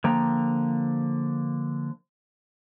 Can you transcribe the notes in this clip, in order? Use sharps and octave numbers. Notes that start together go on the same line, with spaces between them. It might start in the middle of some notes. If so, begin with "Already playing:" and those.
D3 F3 A#3 G5 A#5